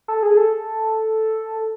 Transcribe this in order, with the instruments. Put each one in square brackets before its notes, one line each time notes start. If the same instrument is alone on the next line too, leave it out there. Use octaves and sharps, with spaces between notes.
[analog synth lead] A4
G#4
A4